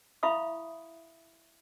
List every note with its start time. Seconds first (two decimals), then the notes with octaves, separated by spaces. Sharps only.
0.23 E4 E5 F5 B5 C#6 D#6